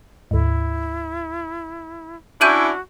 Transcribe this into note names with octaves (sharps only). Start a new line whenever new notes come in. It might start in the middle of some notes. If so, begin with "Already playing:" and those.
D2 G#2 E4
C#4 D4 E4 F#4 G6 D#7 F#7